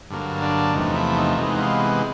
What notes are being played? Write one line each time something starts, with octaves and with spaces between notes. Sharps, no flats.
G2 D3 F#3 A#3
D4
E2 C3 F3 A3 D#4
E4
D#4
C3 E3 G#3 B3 D#4
F4